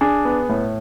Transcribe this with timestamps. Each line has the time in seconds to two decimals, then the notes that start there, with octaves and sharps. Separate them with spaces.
0.01 D4 G#4
0.25 B3
0.49 A2